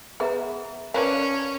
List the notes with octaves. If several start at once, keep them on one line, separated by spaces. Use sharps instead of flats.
B3 G#4 E5 A#5
C#4 A#4 B4 D5 F5 A5